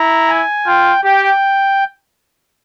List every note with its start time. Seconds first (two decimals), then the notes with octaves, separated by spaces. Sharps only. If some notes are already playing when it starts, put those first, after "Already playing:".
Already playing: E4 A#5
0.28 G#5
0.66 F4 G5
1.04 G4 G5